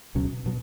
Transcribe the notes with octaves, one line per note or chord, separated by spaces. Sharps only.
C#2 B2 F#3 C#4
B2 F#3